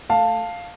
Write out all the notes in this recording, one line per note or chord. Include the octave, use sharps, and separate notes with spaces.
A3 F5 A5